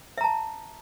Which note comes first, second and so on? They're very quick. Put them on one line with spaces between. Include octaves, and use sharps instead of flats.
E5 A#5 A5